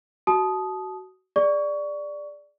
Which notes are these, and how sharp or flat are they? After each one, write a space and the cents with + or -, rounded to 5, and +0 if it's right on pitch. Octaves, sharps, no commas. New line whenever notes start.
F#4 +20 A5 -25 D#6 +0
G#4 +0 D5 +0 C#6 +25